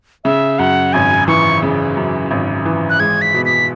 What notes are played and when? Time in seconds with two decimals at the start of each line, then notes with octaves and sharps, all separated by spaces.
0.24 C#3 E5
0.59 F#2 F#5
0.93 G#1 G#5
1.28 E3 C#6
1.62 C#3
1.97 F#2
2.31 G#1
2.65 E3
2.90 F#6
2.99 G#3 G#6
3.22 B6
3.34 B2
3.45 B6